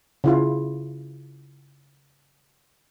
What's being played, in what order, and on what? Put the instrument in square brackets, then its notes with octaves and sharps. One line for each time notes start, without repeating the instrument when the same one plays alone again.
[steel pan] C#3 E4 F4